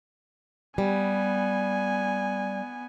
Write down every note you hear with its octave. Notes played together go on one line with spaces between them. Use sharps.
G3 B3 G#5